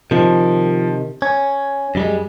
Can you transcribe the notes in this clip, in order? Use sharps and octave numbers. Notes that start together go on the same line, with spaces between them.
C3 D#3 F3
C#4 G#6
F#2 G3 G#3